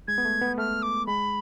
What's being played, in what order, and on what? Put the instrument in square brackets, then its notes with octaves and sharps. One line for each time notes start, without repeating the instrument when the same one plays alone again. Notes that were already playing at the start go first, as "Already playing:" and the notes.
[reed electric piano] G#3 [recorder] G#6
[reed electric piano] B3
A3
B3
[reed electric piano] A3 [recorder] F6
[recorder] D6
[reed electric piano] G#3 [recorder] B5